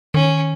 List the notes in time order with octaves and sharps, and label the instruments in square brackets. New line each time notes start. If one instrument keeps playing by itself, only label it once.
[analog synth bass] D#3 [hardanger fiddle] C#4